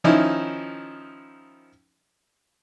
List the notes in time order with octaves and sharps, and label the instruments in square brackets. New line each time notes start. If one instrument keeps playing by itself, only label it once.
[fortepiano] D#3 F3 C#4 D#4 E4